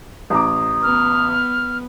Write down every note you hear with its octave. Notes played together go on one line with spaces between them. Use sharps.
A1 A#5 D6 D#6
B3 F6